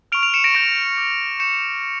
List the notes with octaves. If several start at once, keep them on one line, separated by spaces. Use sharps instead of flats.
C#6 F6 D7 F7
D7 F7
C#7 E7
A#6 D7
C#6 G6 A#6 D7
D6 G6
C#6 G6 C#7 E7